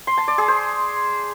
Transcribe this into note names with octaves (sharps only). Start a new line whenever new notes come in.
C6
A5
D5
G#4
C5